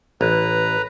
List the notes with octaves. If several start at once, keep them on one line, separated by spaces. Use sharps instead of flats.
A1 B4 A#5